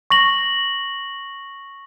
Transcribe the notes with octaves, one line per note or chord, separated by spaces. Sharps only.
C#6 A#6 F#7